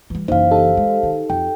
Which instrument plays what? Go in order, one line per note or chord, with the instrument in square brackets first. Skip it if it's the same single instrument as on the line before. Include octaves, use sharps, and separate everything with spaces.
[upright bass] E3 G3
[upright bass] F#1 E3 [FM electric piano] D#4 [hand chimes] C5 F5
[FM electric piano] D#4 G4 A4
[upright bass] G#3
D#3
[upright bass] F2 [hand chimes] G5